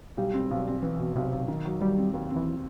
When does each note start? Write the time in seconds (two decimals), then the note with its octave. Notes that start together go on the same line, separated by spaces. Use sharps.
0.17 B1 G3
0.34 C4
0.51 B1
0.67 C4
0.82 E3 C4
0.99 B2
1.16 B1 C3
1.32 B1
1.48 D#3
1.65 F#3
1.80 F#3 G3
1.98 C4
2.14 D#2
2.30 C4
2.36 E3